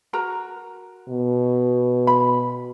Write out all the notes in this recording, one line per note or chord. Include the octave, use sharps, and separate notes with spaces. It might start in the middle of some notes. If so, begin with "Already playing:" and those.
F#4 A#4 A#5
B2
B5